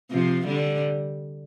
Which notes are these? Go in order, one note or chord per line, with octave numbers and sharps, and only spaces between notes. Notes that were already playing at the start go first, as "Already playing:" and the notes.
C3 F3
D3 G3